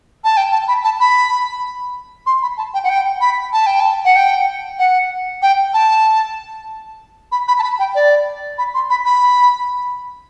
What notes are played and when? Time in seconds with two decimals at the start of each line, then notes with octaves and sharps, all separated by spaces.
0.24 A5
0.37 G5
0.52 A5
0.68 B5
0.84 A5
1.00 B5
2.26 C6
2.42 B5
2.57 A5
2.74 G5
2.84 F#5
2.89 G5
3.21 B5
3.53 A5
3.66 G5
3.80 A5
4.05 F#5
4.16 G5
4.79 F#5
5.42 G5
5.74 A5
7.32 B5
7.48 B5
7.59 A5
7.63 B5
7.79 G5
7.95 D5
8.58 B5
8.74 C6
8.90 B5
9.06 B5